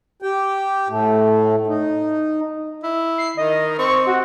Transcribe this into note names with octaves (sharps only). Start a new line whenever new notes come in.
G4 G5
A2 A3
D#4
E4
C7
D#3 D#5
C4 C#6
F#4